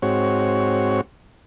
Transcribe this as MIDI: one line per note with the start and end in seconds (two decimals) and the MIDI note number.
0.02 1.01 44
0.02 1.01 60
0.02 1.01 66
0.02 1.01 73